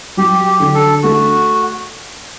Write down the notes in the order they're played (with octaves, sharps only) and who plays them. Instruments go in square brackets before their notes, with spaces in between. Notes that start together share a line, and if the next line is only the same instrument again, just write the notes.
[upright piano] F#3 [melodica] G4
[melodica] G4
[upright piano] D3
[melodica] A4
[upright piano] A3 [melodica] F#4